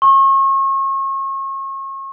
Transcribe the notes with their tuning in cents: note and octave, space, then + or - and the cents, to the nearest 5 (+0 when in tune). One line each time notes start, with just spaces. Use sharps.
C#6 -35